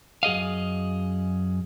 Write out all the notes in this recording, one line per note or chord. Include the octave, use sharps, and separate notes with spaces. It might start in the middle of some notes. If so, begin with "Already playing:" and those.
F#2 G#4 D#5 F5